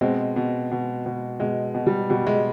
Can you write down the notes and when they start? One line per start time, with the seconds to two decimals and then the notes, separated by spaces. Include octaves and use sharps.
0.01 B2 G#3 C4
0.36 B2
0.72 B2
1.06 B2
1.40 B2 G#3
1.75 B2
1.87 G3
2.10 B2 G3
2.27 G#3